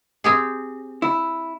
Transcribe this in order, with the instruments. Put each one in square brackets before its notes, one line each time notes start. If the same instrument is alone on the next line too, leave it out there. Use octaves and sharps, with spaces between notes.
[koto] C4 G4 G#4
[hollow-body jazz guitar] E4